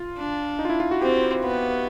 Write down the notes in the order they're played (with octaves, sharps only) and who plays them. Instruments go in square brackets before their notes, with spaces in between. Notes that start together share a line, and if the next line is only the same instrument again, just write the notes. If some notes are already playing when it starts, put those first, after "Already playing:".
Already playing: [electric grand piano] F4
[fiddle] D4
[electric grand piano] D#4
F4
E4
F4
F#4
[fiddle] C4 [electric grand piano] G4
[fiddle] B3